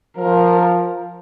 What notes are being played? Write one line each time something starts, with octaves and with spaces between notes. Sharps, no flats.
F3 A#4